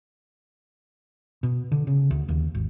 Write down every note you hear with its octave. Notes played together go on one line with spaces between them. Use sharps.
B2
D3
C#3
D2
D#2
G#1